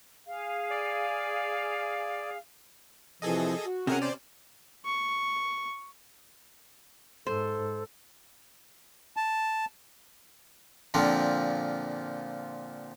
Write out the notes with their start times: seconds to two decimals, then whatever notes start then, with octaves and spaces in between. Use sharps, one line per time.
0.26 G#4 F5
0.71 D5
3.22 C3 E3 F3 G#4 A4 D#5
3.65 F#4
3.87 C3 C#4 G#4 A#4 F#5
4.02 C5 D5
4.85 C#6
7.27 G#2 A4 C5
9.17 A5
10.94 A#2 D3 F3 C4